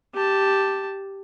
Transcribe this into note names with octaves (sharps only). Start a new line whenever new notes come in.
G4 A5